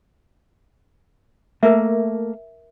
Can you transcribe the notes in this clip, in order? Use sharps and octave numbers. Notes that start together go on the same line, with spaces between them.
A3 A#3 A#4 E5